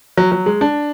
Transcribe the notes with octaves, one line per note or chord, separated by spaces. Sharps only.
F#3
F#3
G#3
D4